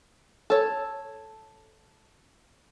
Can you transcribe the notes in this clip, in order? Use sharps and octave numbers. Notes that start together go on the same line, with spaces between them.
A4 C#5